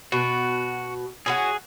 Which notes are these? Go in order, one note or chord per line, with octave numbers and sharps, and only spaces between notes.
B2 F#4
C#4 E4 F#4 G#4